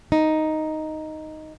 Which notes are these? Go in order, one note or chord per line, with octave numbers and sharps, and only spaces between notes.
D#4